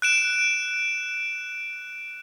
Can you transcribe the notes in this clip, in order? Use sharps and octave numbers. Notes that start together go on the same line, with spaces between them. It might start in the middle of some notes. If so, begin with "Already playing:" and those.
F#6 D7 E7